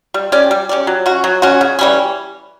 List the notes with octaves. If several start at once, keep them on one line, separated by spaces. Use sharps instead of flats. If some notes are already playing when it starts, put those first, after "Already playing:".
G3
C#4 G4 D5
G3
C#4 G4 D5
F#3
C#4 F#4
F#3
C#4 F#4
C#3
E3 G3 C#4